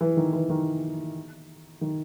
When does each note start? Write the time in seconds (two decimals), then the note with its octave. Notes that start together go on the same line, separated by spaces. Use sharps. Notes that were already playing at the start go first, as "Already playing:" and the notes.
0.01 E3
0.17 D#3
0.33 E3
0.50 D#3
1.81 D#3